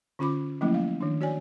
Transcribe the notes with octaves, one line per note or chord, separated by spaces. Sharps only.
D3 C#4 F4 B5 D6
F3 F#3 A3 A#3 C#4 E4
F5
D#3 D4
F#4 C#5 D5 G#5